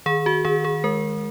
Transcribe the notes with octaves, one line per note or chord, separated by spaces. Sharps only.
D#3 G#4
F#4
D#3 G#4
G#4
G#3 A#4